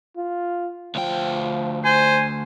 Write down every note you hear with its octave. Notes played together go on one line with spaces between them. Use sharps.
F4
D2 F3 G5
C5 G#5